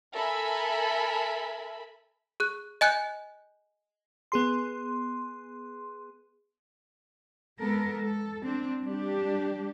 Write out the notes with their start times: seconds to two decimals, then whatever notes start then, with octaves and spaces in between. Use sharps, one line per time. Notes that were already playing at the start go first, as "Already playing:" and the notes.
0.13 A4 A#4 E5 G#5 B5
2.40 G#4 F#6
2.81 D#5 G#5 F#6 G6 C#7
4.32 B3 G#4 C6
7.59 G#3 B3 A4 A#4
8.05 A4
8.42 C4 D4
8.82 G3 D4 G4